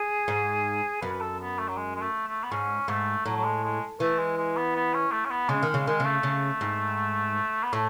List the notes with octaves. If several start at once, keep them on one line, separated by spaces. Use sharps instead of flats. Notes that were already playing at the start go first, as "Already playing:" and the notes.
Already playing: G#4
G#2
F#2 B4
B4
A4
B3
A3
F#3
G#3
G#3
A3
A3
B3
G#2 C#4
G#2 A3
A2 F#3
F#3
G#3
G#3
E3 A3
G#3
G#3
B3
B3
C#4
A3
C#4
B3
C#3 G#3
D#3
G#3
C#3
D#3 G#3
C#3
A3
C#3
G#2
B3
A2 A3